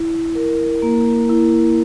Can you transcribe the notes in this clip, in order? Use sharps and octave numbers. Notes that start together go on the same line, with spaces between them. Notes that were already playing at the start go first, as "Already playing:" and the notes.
Already playing: E4
A#4
A#3
E4